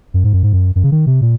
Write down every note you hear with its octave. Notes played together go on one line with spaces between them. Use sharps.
F#2
G#2
F#2
G#2
F#2
F#2
C#3
D#3
C3
A#2